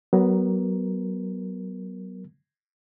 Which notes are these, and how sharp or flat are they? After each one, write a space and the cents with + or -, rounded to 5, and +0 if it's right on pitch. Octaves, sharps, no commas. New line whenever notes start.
F#3 +30 B3 +0 A#4 +0